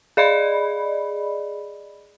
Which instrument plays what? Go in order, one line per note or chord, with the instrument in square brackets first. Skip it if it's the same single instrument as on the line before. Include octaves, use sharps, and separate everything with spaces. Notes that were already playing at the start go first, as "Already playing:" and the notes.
[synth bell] G#4 D5 D#5 B5